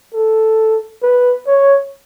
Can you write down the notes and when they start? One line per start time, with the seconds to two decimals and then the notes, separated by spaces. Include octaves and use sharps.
0.14 A4
1.03 B4
1.47 C#5